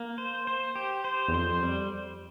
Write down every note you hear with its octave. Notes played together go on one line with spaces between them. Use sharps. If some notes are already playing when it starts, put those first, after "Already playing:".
Already playing: A#3
C5
C5
G4
C5
E2
F2 C5
G3